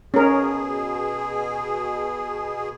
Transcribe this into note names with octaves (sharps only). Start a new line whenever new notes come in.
B2 C#4 G#4 A#4